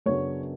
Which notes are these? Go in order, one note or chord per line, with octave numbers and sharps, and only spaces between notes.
F#2 C#3 F#3 B3 D4 C#5